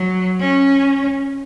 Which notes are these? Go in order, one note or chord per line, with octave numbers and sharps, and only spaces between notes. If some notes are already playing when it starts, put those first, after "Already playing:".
Already playing: F#3
C#4